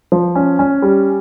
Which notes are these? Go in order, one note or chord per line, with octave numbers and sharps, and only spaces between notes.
F3
C#4
C#4
G3